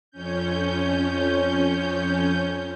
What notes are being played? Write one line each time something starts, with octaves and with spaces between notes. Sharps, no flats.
F2 C#4 G6